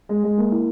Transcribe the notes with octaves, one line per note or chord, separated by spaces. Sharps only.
G#3
G#3
A#3
E4